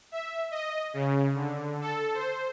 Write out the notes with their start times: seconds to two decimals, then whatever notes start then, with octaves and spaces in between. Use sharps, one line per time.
0.12 E5
0.51 D#5
0.94 C#3
1.34 D3
1.81 A4
2.14 C5